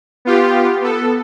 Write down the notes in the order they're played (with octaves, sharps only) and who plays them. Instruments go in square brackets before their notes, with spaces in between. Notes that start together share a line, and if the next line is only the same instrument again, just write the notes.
[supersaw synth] B3 F4 G4
B3 A4